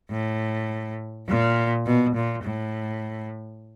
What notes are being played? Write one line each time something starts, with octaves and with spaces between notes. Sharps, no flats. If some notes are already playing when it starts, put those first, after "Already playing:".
A2
A#2
B2
A#2
A2